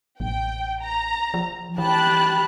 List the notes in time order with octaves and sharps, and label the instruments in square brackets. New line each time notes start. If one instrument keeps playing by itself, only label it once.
[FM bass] A1 [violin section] G5
[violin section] A#5
[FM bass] F3
[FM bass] E3 [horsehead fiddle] G4 B5 [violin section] G5 A5 F#6